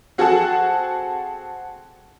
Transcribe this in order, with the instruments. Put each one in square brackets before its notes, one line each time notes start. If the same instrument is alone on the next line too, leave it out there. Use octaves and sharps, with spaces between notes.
[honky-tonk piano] C4 F#4 G#4 A4 F#5 A5